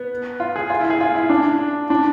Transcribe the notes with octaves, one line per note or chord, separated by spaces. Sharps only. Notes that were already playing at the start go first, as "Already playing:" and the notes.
Already playing: B3
F4
G#4
F4
E4
G#4
F4
E4
D4
D4